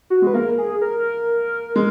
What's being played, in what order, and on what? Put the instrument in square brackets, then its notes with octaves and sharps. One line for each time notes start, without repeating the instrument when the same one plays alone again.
[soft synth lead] F#4
[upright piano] G#3
[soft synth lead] B4
[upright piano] A#3 [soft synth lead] A#4
[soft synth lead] G#4
A#4
[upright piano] G#3